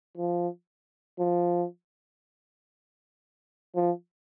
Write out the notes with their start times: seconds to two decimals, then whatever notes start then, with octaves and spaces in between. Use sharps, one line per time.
0.17 F3
1.19 F3
3.75 F3